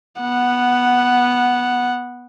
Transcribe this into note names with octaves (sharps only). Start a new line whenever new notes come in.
B3 F#5